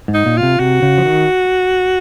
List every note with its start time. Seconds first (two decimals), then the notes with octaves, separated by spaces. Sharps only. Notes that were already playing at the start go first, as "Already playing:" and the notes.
0.08 G#2
0.14 D#4
0.26 A#2
0.37 F4
0.43 C3
0.59 C3 F#4
0.82 C#3
0.98 F3
1.05 D#3